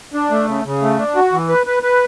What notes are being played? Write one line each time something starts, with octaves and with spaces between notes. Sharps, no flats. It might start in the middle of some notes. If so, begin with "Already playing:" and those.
D4
A3
C#3
C#3
A3
D4
F#4
E3
B4
B4
B4